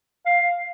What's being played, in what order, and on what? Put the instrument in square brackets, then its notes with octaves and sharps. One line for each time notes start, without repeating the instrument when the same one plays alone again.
[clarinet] F5